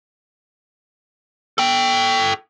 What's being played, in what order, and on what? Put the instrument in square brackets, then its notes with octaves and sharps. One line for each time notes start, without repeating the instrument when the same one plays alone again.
[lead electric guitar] A4 G5